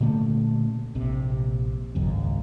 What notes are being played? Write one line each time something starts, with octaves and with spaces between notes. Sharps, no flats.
A#2 D3 A3 C#4
A#1 C3
G#1 C#2 F#2